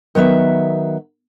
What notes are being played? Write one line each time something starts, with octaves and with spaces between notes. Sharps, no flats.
D#3 F#3 B3 E5